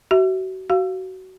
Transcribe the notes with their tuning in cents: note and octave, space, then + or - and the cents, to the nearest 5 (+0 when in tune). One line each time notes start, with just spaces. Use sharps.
F#4 +30 E5 -5
F#4 +20 F5 -5